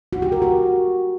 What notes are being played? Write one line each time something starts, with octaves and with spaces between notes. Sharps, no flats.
F#4
G4
A#4
F#4